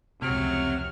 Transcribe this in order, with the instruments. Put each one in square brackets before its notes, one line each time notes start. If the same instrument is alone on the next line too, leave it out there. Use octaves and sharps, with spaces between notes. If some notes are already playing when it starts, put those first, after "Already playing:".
[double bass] F1 C#2 [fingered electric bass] C3 [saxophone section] F#3 [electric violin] F6